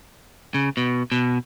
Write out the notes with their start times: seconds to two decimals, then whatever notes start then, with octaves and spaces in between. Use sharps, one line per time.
0.54 C#3
0.77 B2
1.12 B2